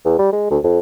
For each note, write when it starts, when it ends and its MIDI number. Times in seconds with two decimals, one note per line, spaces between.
0.05 0.15 40
0.19 0.28 55
0.33 0.50 56
0.50 0.59 38
0.64 0.79 41